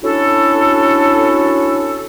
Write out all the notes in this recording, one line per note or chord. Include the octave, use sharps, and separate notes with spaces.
C#4 D4 E4 F#4 A4